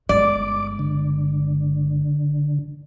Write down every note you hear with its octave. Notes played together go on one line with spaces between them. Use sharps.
G1 G#3 D5 D6
D3